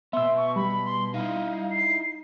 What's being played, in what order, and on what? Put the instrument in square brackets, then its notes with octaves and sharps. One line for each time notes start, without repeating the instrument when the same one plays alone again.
[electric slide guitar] B2 B3 [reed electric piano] E5 E6 [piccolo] C6
[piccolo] C#6
[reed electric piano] G3 [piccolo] B5
[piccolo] C6
[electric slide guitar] D#4 E4 [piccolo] F5
[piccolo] C7